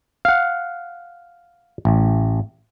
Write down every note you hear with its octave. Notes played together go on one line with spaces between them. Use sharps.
F5 F#5
A1